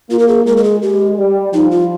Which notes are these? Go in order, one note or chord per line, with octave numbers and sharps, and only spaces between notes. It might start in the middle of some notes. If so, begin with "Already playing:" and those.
A#3 F4
A#4
G#4
G#3 A#4
A#4
G#4
G#3 G4
G3
F3 D#4
F4